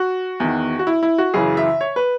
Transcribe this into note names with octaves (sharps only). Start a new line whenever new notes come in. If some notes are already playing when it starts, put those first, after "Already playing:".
Already playing: F#4
E2 D#3
F#4
E4
E4
F#4
F#2 C#3 E3 G#4
E5
C#5
B4